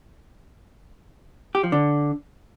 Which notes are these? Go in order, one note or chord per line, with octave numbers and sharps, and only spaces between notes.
G4
F3
D3